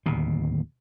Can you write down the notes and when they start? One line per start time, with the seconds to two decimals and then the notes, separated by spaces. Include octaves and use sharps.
0.06 D1 D#2 B2